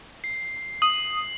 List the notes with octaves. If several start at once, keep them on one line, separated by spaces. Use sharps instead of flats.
C7
D#6 F#7